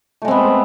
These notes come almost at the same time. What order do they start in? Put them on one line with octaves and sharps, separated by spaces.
A3 G#3 C4 B3